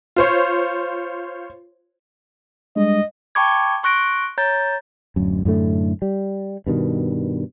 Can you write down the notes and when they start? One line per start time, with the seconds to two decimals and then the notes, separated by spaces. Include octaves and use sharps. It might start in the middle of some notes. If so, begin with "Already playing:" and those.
0.16 F4 C5 C#5
2.76 G3 G#3 D4 D#5
3.35 G5 A5 B5 C#6 D6 G#6
3.83 C6 C#6 F#6 A#6 D7
4.38 C#5 A#5 G6 A6
5.16 D1 F#2
5.45 F#2 A2 D3 A3
6.02 G3
6.67 G2 B2 D#3